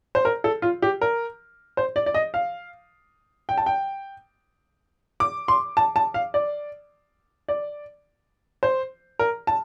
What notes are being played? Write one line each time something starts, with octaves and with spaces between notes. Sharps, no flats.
C5
A#4
A4
F4
G4
A#4
C5
D5
D5
D#5
F5
G5
A5
G5
D6
C6
A5
A5
F5
D5
D5
C5
A#4
A5